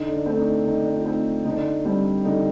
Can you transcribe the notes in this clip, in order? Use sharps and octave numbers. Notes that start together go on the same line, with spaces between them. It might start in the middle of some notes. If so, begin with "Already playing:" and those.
Already playing: D3 D#4
D4
A3 C4
D4
D#4
D3 D#4
D4
F4
A3 C4 D#4
D3 D#4
D4
D#4
G3 C4 D4
D3 D#4